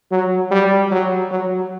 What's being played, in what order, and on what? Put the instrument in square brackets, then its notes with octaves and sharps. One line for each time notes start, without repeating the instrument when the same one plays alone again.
[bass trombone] F#3
G3
F#3
F#3